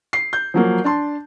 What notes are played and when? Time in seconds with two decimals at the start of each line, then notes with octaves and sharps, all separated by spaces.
0.13 C7
0.33 G6
0.54 F3 F#3 A#3
0.84 D4 A5 C6